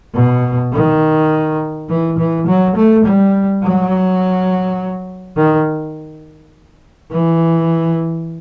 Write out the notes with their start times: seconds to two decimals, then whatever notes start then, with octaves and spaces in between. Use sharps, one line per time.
0.14 B2
0.73 D#3
1.89 E3
2.18 E3
2.47 F#3
2.76 A3
3.05 G3
3.63 F#3
5.36 D#3
7.11 E3